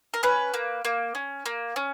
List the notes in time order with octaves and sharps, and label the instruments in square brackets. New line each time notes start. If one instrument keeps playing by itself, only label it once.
[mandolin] A#4
C#4 B4
A#3
A#3
C#4
A#3
C#4